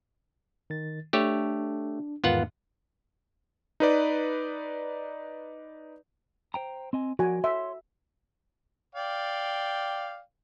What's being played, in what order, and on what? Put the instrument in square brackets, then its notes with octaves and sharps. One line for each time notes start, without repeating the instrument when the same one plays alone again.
[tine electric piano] D#3 A6
[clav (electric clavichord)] A3 G4 C#5 [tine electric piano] D4
[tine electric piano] E2 G#2 D#3 [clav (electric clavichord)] B3 F4 F#5
[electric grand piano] D#4 B4 D5
[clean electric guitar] C5 G5 A#5
C4 D#5 G#5
[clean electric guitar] F3 A#4 D5 [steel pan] F#4 G#5
[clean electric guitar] C#5 C6 [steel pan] E5
[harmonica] D5 F5 G5